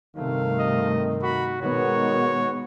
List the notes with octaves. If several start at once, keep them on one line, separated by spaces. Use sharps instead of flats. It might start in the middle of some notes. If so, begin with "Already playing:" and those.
G2 C3 D#3 A3 F5
D#5
F#4 B5
B2 D#3 G#3 B3 F#4 C#5